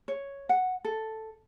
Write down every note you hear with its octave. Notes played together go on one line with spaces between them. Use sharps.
C#5
F#5
A4